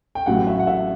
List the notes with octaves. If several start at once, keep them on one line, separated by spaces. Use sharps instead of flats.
G5
A1 A2 F#3 F#5
E5
F#5
E5